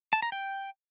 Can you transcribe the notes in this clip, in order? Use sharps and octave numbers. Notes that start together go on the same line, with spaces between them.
A5
A#5
G5